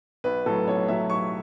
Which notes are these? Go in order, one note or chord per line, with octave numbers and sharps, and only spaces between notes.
B1 B4
A2 F#3 A4
B1 C#5
A2 F#3 E5
B1 C#6